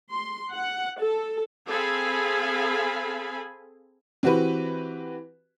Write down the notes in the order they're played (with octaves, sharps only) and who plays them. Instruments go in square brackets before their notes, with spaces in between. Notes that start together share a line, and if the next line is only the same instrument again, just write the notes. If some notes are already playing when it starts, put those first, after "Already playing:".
[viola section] C6
F#5
A4
C4 G#4 A4 F5 G#5 B5
[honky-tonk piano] E3 C4 F#4 G4 B4